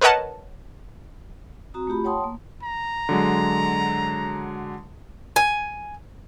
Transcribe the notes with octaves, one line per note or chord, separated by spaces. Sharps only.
A#4 B4 C#5 D#5 F#5 A5
C4 F#4 A#5 D#6
A3 F4 G4 B5
C#5 F#5 G5 A5 C6 D#6
A#3
A#5
D3 F#3 G#3
G#5